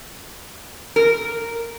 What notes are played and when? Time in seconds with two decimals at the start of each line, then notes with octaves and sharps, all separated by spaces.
0.96 A#4